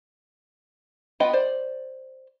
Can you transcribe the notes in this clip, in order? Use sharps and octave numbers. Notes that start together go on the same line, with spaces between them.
B3 F4 D#5 G5 B5
C5 D5